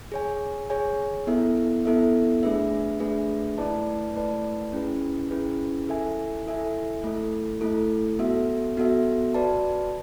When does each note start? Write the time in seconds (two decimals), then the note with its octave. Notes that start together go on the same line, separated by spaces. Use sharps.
0.12 G#4 C#5 G#5
0.70 G#4 C#5 G#5
1.27 B3 E4 A4 E5
1.85 B3 E4 A4 E5
2.43 A3 D4 G#4 B4 E5
3.00 A3 D4 G#4 B4 E5
3.58 A3 E4 B4 D5 A5
4.16 A3 E4 B4 D5 A5
4.73 C#4 E4 G#4 B4
5.31 C#4 E4 G#4 B4
5.88 E4 A4 E5 G#5
6.46 E4 A4 E5 G#5
7.04 A3 E4 A4
7.61 A3 E4 A4
8.19 B3 F#4 A4 E5
8.77 B3 F#4 A4 E5
9.34 F#4 B4 D5 A5